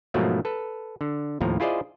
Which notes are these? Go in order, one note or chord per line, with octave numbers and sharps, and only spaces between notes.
G#2 B2 F3 F#3 A3 A#3
A4 B4
D3
D#2 A2 F3 A#5
E4 F4 G#4 C5 D5 D#5